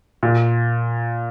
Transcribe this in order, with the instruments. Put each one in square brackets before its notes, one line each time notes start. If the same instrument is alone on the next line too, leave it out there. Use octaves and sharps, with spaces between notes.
[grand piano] A#2